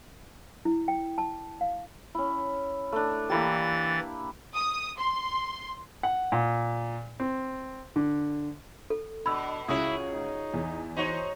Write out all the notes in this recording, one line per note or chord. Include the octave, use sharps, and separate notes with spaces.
E4
G5
A5
F5
C#4 E4
A3 D4
E3 A#3 E4 G4 A6
D#6
C6
F#5
A#2
C4
D3
A4
B2 D4 B5 E6
C#2 E4 F#4 G#4 C#5 D#6
D#4
E2
D#4 F#4 C5 C#5